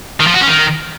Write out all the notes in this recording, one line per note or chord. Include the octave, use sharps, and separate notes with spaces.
D#3
F3
F#4
C#4
D#3